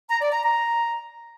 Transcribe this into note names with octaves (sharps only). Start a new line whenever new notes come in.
A#5
D5
A#5
A#5